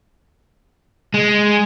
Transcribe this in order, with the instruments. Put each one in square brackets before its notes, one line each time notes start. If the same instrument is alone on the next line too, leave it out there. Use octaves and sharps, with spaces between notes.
[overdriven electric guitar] G#3